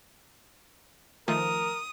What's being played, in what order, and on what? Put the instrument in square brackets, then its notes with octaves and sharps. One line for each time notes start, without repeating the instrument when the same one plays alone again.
[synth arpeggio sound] D#3 F3 A3 [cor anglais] A#4 [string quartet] D#6